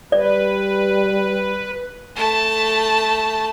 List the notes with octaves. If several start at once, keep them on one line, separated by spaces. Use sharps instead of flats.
G3 B4 D5
A3 A5